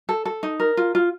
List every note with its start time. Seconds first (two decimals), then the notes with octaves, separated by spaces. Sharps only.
0.09 A4
0.25 A4
0.43 D#4
0.60 A#4
0.77 F4
0.95 F4